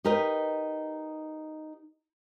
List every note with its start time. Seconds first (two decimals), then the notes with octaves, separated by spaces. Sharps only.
0.04 D#4 G4 A#4 B4 D#5